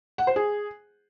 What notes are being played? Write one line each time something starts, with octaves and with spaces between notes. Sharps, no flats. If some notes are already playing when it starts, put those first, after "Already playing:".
F#5
C5
G#4